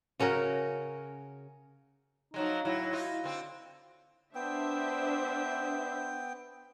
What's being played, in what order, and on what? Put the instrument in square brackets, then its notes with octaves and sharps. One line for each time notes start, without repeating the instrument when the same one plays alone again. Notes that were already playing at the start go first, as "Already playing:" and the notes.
[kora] C#3 C#4 F#4 A#4
[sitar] F3 F#3 G#3 [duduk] D#4
[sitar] A2 F#3 [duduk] E4
[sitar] D#4 F4
D3 C4
[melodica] B3 G5 [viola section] D4 C5 E5